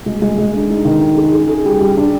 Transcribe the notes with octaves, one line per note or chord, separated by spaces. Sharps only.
G#3
G#3
G#3
D4
D#4
D#3
D#4
G#4
G#4
G#4
G3
G3
D4